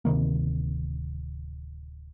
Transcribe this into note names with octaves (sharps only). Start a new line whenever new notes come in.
D1 C3 D#3 A#3